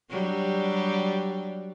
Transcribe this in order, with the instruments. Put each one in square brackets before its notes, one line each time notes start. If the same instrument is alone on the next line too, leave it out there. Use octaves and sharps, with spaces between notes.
[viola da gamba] F#3 G3 D4